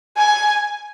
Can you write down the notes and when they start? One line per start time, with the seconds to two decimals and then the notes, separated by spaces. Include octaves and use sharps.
0.17 G#5